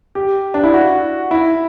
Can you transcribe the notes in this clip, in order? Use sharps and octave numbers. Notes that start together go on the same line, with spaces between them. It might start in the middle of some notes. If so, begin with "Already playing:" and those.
G4
D4
E4
F#4
E4